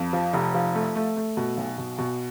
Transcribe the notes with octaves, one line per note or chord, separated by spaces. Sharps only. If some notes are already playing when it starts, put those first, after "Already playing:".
Already playing: F2
F3
F1
F3
A3
A3
A3
B2
B1
B2
B2